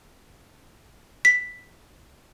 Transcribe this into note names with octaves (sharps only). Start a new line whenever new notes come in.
B6